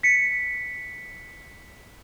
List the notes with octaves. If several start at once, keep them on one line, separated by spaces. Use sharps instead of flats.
B6 C#7